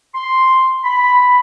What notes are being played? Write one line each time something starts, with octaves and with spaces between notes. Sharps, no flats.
C6
B5